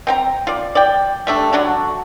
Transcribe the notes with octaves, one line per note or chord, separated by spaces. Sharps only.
C4 G5 A#5
F4 D5
D5 G5
G3 A3 D4
D3 F#3 D4 F#4